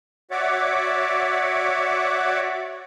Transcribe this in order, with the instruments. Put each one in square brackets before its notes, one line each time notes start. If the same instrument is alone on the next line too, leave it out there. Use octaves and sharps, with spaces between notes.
[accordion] F#4 C#5 D5 E5 F#5 D6